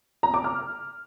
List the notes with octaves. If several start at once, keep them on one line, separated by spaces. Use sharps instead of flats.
A#5
D6
F6